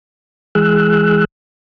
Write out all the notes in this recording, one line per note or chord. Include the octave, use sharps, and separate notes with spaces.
E3 G#3 G#4 E6 F#6